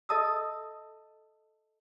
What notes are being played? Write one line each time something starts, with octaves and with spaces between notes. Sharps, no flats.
A4 D#5 E5 A5 D#6 E6